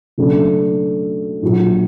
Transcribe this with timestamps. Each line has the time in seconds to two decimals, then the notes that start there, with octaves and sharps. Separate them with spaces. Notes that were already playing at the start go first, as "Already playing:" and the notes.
0.18 F#1 F#2 F#3 A3 D4
1.42 A#1 A#2 F#3